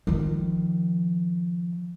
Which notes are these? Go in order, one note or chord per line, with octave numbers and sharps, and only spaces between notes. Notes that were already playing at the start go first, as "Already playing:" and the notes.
D#3 F3